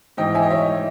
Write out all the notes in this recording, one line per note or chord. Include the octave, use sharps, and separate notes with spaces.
G#2 E3 D#5 G5
E5 G#5
D#5
C#5 E5